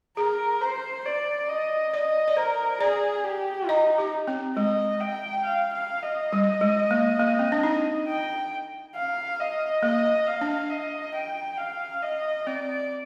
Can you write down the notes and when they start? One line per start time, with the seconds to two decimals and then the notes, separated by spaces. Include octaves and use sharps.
0.17 G#4 A#4
0.61 C5
1.06 D5
1.49 D#5
1.93 D5 D#5
2.28 D5
2.37 A#4 C5
2.81 G#4 D5
3.24 G4
3.69 D#4 D#5
3.98 G4
4.28 C4
4.57 G#3 D#5
5.00 G5
5.44 F5
5.73 F5
6.03 D#5
6.33 G3
6.61 G#3
6.91 A#3
7.19 A#3
7.39 C4
7.52 D4
7.63 D#4
8.08 G5
8.95 F5
9.39 D#5
9.83 A#3 D#5
10.27 F5
10.41 D4
10.70 D#5
11.14 G5
11.58 F5
12.02 D#5
12.47 C4 D5